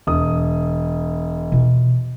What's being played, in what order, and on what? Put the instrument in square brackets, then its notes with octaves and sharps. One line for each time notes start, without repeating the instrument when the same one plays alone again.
[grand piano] E1 D#6
[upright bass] B2 F4